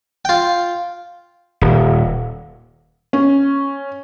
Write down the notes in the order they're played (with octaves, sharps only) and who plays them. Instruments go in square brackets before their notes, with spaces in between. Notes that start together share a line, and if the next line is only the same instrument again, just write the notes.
[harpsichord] F4 G5
[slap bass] D#1
[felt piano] C#4